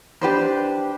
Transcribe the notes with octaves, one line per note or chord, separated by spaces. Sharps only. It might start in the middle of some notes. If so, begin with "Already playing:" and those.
D4 G4 B4 C5